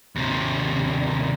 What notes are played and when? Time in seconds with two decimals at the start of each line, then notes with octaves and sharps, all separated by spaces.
0.16 D#2 C3